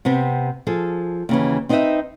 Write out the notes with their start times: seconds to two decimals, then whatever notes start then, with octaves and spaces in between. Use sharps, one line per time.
0.05 C3 B3 C4
0.67 F3 G#4 A4
1.29 D#2 C#3 E3
1.69 C4 D#4 B4 C5 D#5 E5